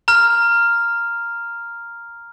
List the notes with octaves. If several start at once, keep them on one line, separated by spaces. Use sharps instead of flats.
A#5 F6